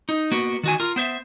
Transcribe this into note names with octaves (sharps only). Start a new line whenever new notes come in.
D#4
A#3 B3 F#4
D#3 F#4 G#5
F4 A#4
B3 C5 E5